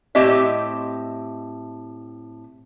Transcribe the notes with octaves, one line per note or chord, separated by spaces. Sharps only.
A2 C4 G4 D#5 E5